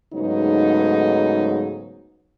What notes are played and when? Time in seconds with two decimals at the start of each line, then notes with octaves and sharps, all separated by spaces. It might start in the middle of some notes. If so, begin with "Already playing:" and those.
0.14 G#2 C#3 F#3 A3 B3 D#4